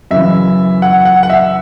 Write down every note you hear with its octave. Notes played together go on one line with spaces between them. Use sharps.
F#2 C#3 E3 E5
F#5
F#5
F#5
E5